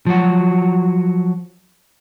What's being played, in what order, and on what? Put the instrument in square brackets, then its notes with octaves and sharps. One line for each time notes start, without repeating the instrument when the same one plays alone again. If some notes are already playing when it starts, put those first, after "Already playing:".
[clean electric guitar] F3 F#3 F#4